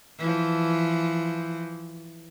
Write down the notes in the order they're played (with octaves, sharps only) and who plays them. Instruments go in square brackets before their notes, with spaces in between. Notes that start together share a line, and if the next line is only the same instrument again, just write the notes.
[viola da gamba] E3 F3